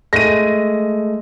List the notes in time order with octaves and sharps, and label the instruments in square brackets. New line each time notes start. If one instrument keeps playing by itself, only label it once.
[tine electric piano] G#3 A3 [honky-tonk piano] A#6 D#7